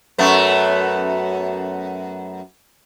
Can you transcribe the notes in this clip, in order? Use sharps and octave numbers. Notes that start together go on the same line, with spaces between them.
F#2 A3 B3